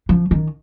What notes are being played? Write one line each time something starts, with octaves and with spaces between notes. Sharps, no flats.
F3
D#3